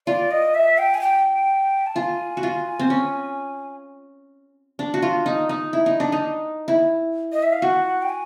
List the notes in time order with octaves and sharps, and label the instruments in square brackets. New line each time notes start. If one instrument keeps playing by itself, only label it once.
[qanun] F4 [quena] D5
[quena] D#5
E5
G5
G#5
G5
A5
[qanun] F4 [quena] G#5
[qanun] F#4
F4
C4
C#4
D4
F#4
F4
D#4
D#4
E4
D#4
D4
D#4
E4
[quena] D#5
E5
F5
[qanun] F#4 [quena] F#5
[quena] G5
G#5